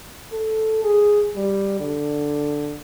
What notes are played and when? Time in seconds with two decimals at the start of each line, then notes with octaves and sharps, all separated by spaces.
0.32 A4
0.84 G#4
1.36 G3
1.80 D3